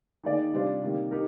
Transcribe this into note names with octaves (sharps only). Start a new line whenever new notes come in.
D#3 A#3 D#4 G#4 D5
C3 G3 D4 F4 C5
C3 D#3 G3 A#3
D#4 G4 A#4